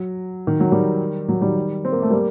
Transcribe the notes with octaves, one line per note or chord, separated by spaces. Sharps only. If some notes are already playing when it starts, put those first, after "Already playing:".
Already playing: F#3
D#3
F#3
D#3 G3
F#3
D#3 G3
C4
A#3
A3
G3 A#3